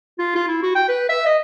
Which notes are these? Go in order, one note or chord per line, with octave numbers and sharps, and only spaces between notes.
F4
F4
E4
F#4
G5
B4
E5
D#5